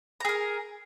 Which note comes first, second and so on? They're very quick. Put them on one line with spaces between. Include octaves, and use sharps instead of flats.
A#5 G#4 A#4